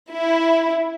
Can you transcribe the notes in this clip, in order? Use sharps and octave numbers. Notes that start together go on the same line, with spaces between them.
E4